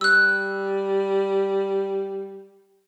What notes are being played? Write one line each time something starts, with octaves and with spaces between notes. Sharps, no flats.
G3 E6 F#6